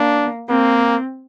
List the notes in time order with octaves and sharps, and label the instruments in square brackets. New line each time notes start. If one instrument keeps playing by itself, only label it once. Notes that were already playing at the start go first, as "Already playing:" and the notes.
Already playing: [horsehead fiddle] A#3 [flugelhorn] D4
[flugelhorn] A#3 [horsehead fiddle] C4